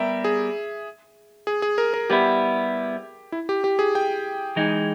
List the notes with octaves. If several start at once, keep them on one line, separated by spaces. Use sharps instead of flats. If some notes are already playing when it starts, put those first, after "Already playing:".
Already playing: G3 B3 G4 A#4 E5
G#4
G#4
G#4
A#4
A#4
G3 B3 E4 G4
E4
G4
G4
G#4
G5
E3 G#3 D#4